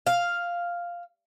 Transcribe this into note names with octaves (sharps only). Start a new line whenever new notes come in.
F5